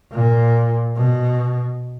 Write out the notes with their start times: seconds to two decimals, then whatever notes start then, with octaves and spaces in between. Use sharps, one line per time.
0.12 A#2
0.97 B2